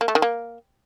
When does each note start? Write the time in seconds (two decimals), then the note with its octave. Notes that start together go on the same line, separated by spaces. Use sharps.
0.01 A#3
0.08 A3
0.15 D#3
0.22 A#3